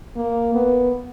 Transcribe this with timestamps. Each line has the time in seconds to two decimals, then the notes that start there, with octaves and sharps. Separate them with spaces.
0.16 A#3
0.54 B3